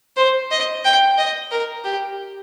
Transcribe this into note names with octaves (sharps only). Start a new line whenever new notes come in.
C5
D#5
G5
D#5
A#4
G4